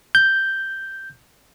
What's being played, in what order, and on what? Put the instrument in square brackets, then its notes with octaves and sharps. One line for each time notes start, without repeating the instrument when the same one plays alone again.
[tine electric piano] G6